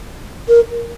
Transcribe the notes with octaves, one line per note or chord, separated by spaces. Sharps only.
A#4